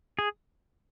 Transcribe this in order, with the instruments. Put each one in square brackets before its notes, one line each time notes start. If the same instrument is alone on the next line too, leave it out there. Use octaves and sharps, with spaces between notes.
[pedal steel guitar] G#4